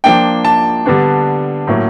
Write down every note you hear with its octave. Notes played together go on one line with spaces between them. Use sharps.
F3 A#3 D4 G5
A5
D3 G3 B3 D4
A2 F#3 A#3 C#4